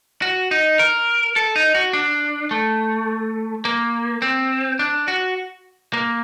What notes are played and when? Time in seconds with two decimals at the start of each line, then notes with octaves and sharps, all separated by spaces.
0.22 F#4
0.51 D#4
0.79 A#4
1.36 A4
1.56 D#4
1.75 F#4
1.93 D4
2.51 A3
3.65 A#3
4.22 C4
4.79 D4
5.08 F#4
5.94 A#3